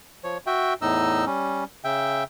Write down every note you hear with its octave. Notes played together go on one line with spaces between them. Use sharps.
F3 C#5
F#4 E5 G5
E2 A2 D#4 D#5 E6
G3 C#4
C#3 E5 G5